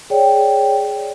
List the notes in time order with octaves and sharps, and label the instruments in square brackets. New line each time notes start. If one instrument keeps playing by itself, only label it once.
[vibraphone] G#4 C#5 D5 G5